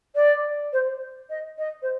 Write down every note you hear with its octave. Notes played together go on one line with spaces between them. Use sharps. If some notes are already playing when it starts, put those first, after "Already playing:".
D5
C5
D#5
D#5
C5